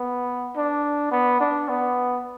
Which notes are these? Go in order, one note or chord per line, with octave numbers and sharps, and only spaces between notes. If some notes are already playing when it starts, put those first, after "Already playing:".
Already playing: B3
D4
B3
D4
B3